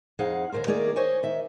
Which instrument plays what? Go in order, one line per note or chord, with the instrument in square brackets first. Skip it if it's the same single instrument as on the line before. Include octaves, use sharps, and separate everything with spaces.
[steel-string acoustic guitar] F2 D#4 G#4 F5 F#5
D#2 D3 D#3 A#4 C5
D#3 A3 A#3 G#4 A#4 D5
C5 C#5 D#5 G#5
D#3 E5